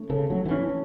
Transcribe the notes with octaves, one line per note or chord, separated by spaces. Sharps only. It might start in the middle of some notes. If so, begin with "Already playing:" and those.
Already playing: A3 C#4
C#3 A4
F#3 A3
E3
C#4